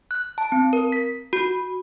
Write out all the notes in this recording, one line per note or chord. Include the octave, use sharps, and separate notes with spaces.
F#6
A5
C4
A#4
B6
F#4